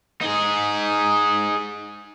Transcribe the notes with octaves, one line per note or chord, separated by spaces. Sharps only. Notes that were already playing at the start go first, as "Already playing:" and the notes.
D#4 G#4